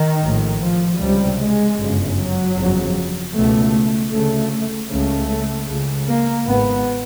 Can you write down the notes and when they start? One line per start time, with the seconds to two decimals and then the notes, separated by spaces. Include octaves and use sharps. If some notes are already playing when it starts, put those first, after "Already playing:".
Already playing: D#3
0.22 A#1 A2
0.61 F3
0.99 C#2 C3 G3
1.39 G#3
1.78 G1 F#2 C#3
2.17 F#3
2.55 G1 F2 C#3
3.34 C#2 B2 A3
4.12 D2 C#3 A3
4.90 C#2 C#3 A3
5.68 C#2 C#3
6.07 A#3
6.46 G#1 G#2 B3